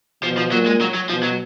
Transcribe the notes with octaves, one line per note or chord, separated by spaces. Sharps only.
B2 F3
F3
A#2 F#3
G#3
F#3
F#3
B2 F3
F#3